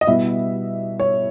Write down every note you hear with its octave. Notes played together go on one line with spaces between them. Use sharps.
D#5
B2 G3 B3 E4 E5
C#5